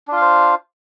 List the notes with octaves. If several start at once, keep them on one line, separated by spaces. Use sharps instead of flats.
D4 F4 C5 F5